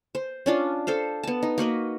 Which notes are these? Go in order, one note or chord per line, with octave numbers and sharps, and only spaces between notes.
C5
C#4 D4 F4
A4 C5 F5
B3 A5
D#4
A#3 F#4 B4 D#5